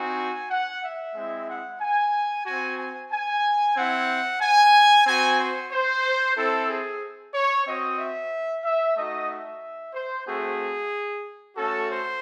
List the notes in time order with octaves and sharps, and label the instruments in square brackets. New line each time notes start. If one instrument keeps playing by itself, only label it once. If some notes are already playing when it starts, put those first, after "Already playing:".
Already playing: [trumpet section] C4 D#4 F#4 G#5
F#5
E5
G#3 C4 E4
F#5
G#5
C4 F#4 G#5
G#5
G#5
C4 E4 F#5
G#5
C4 F#4 G#5
C5
C5
C4 E4 A4
G#4
C#5
C4 F#4 D#5
E5
E5
A3 D#4 F#4 D#5
E5
C5
A3 C4 F#4 G#4
A3 C#4 F#4 A4
C5